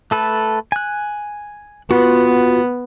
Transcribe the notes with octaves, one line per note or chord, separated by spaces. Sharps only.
A3 A4 B4
G#5 F#6
B3 F4 F#4